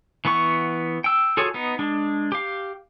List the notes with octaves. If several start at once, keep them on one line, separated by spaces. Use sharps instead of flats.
E3 B3 F#5 C#6
G5 E6
F4 F#4 G#4 A4 C#5
B3 D#4
G#3 D4
G4 F5